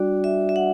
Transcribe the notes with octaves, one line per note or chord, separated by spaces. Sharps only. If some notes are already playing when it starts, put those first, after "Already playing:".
Already playing: G3 D4 F#4 D5
E5
E5
F#5